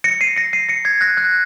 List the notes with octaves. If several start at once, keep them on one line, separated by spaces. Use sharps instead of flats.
A#6 C#7
C7 D#7
A#6 C#7
C7 D#7
A#6 C#7
G#6 C7
F#6 A#6
F#6